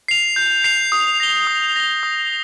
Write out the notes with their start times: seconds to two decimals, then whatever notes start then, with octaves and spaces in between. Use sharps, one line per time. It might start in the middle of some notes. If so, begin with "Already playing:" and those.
0.08 C7 F7
0.36 G6
0.64 C7 F7
0.92 D#6
1.20 A#6 G7
1.47 D#6
1.76 A#6 G7
2.03 D#6